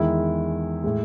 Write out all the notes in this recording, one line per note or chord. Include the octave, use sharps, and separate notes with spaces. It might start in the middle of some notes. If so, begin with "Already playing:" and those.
Already playing: E2 D#3 G#3 E4
A2 G#3